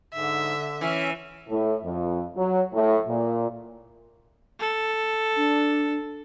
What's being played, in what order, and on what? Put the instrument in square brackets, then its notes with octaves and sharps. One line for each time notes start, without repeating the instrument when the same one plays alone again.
[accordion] G#2 [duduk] D3 [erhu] E5
[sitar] E3 [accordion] C#4 E5
[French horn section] A2
F2
F#3
A2
A#2
[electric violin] A4
[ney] D4